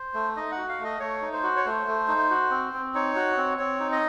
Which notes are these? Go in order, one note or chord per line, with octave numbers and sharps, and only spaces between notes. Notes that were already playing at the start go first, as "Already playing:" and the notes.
Already playing: C5
A3
D#4 D#5
F#5
F#4
F5
A3 D#5
A3 C#5
D#4
C5
F#4
C#5
A3 C5
A3
D#4
F#4
C4
C4
D#4 C#5
F#4
C4
C4 C#5
D#4
D#5